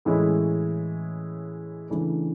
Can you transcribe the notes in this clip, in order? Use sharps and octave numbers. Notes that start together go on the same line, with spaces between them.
A2 E3 G#3 C#4 E4
C#3 E3 A3 D4